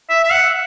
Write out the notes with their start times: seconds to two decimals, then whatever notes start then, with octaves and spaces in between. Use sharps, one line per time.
0.10 E5
0.24 E5
0.32 F#5